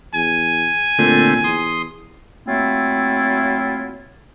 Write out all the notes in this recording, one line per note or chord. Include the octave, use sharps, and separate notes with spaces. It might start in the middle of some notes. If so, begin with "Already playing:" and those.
E2 G#5
A#2 D3 A3 C4
E2 C6 D#6
F#3 A3 A#3 C4 E4 F4